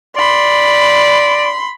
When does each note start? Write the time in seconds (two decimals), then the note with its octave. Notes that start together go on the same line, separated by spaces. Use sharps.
0.16 D5 B5 C6